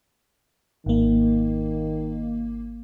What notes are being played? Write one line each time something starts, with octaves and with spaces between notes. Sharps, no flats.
G#1 D#3 A#3